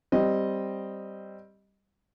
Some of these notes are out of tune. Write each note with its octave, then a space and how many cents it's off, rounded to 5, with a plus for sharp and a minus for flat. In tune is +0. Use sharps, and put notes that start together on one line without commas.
G3 +0 C4 +0 D#5 +0